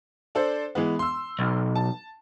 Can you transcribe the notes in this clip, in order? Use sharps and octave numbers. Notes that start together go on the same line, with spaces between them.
D4 A4 C5
E3 G#3 B3
C6 E6
B1
A5